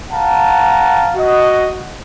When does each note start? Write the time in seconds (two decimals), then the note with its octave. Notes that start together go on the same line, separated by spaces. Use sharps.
0.11 F5 F#5 A5 A#5
1.16 F#4 D#5